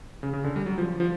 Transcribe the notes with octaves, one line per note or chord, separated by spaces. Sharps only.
C#3
C#3
D3
G3
F#3
F3
F3